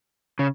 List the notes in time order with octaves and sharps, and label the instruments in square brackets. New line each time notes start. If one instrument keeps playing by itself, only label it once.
[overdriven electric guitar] C#3